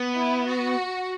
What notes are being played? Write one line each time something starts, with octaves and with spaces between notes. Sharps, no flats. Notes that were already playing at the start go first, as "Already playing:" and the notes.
Already playing: B3
E4
F#4